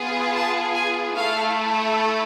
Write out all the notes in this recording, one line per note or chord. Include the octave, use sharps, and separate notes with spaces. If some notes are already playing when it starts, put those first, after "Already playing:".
Already playing: B3 F4 G#4
A5
G#5
A3 E4 A4 F5